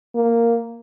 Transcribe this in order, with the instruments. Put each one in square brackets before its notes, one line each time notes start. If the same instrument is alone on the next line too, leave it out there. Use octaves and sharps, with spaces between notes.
[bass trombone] A#3